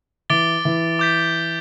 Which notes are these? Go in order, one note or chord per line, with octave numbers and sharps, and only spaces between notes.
E3 D6 A6 D7 G7
E3
D6 G6 B6